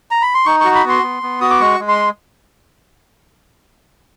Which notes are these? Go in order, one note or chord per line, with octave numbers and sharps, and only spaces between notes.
A#5
B5
C6
D#4 C#6
F#4 C#6
B5
B3 C6
B3
B3
F#4 D#6
D6
G#3 C#6
G#3
C6